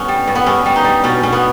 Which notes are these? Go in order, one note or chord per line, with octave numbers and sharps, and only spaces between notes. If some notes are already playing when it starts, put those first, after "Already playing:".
Already playing: G2 B3 C#4
G3
G2
B3
G2 C#4
G3
D#4
G3
B2 C#4
B2 C#4
B3